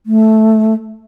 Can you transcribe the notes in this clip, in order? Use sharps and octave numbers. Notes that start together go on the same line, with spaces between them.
A3